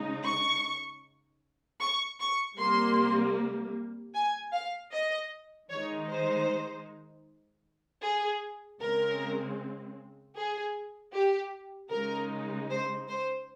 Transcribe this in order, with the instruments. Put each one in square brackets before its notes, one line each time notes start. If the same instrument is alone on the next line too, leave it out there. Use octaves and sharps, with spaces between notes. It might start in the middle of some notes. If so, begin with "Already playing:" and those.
Already playing: [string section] C#3 G#3 D#4
C#6
C#6
C#6
C3 G3 A#3 C6
G#5
F5
D#5
D#3 G#3 D#4 C#5
C5
G#4
C#3 G#3 C4 A#4
G#4
G4
C#3 G#3 D#4 A#4
C5
C5